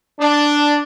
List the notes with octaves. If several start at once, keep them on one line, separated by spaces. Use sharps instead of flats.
D4